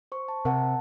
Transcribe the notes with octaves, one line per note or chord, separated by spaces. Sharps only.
C5 C#6
A5
C3 A#4 F#5 A5